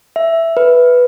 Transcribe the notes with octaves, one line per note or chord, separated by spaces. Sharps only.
E5
B4